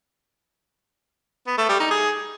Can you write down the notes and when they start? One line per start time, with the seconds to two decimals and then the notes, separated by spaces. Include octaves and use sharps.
1.47 B3
1.58 A3
1.69 G3
1.80 D#4
1.91 G#4